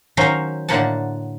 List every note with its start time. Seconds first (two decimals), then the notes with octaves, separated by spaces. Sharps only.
0.17 D#3 F#3 C#4 C5 F5 A#5
0.69 A2 D3 A#3 F#5 A5